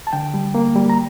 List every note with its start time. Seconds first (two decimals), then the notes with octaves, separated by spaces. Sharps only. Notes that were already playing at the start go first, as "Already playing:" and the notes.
0.07 A5
0.13 D3 G5
0.34 G3
0.55 A#3
0.76 G3
0.90 A#5